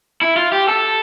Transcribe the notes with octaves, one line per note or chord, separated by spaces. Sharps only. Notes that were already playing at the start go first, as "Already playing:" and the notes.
E4
F4
G4
A4